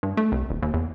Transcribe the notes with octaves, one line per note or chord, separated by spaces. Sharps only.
G2
A3
C2
D#1
D#2
E2